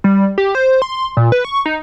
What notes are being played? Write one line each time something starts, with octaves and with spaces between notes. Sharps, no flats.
G3
G4
C5
C6
A#2
B4
C#6
D#4